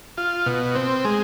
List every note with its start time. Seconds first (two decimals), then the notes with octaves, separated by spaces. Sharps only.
0.17 F4
0.46 B2
0.75 C4
1.05 G#3